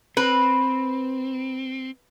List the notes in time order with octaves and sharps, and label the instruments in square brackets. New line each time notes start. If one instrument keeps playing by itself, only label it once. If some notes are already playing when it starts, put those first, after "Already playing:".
[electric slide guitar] C4 [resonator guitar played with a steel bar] B4